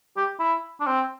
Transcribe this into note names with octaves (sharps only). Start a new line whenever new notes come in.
G4
E4
D4
C4